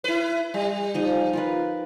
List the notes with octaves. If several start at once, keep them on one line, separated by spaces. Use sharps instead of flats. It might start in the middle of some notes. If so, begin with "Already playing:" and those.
E4 B4
G3
F3 D#4 D#5
F4 A#4 B4